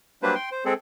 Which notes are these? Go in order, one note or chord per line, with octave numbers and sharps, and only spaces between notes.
F#3 G3 A#3 D4 B4 C5
G5 C6
C5
G#3 C4 G#4 A4